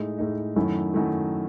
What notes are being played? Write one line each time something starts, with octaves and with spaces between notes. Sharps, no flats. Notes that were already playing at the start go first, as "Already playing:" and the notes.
Already playing: A2 G#3 D#4
A2 G#3 D#4
F#2 D#3 F#3 A3 E4
F#2 D#3 F#3 A3 E4